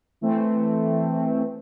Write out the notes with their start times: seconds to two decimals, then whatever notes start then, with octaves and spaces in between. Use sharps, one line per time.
0.21 E3 A3 C4